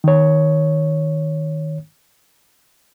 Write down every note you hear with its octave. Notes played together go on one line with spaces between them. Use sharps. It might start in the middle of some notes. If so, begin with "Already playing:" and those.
D#3 C#5